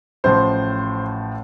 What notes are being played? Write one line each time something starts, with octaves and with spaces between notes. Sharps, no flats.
A1 A2 F3 C5